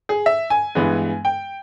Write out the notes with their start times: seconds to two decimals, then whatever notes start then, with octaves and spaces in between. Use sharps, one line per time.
0.09 G#4
0.26 E5
0.50 G#5
0.75 G2 E3 G#3 B3
1.25 G5